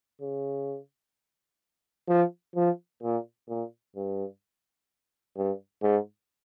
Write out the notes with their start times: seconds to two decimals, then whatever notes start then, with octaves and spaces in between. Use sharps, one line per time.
0.22 C#3
2.08 F3
2.56 F3
3.03 A#2
3.49 A#2
3.96 G2
5.36 G2
5.83 G#2